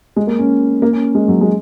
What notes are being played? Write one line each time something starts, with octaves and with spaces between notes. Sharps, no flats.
G#3
A#3
C#4
A#3
C#4
G#3
F#3
G#3